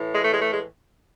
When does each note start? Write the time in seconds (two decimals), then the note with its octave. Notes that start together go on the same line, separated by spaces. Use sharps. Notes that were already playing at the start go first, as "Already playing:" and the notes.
Already playing: A2 E3
0.14 G#3
0.23 A3
0.33 G#3
0.42 A3
0.50 G#3